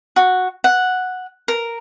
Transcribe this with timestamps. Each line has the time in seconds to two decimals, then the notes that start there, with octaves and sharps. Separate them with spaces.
0.16 F#4
0.64 F#5
1.48 A#4